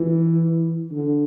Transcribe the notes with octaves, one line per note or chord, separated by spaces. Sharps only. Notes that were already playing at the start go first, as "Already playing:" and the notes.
Already playing: E3
D3